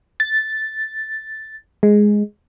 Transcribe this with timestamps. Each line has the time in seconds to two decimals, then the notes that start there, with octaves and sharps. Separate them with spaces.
0.20 A6
1.83 G#3